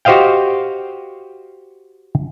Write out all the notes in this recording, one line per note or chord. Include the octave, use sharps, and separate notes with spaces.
F#4 G4 C5 D#5 F5 G5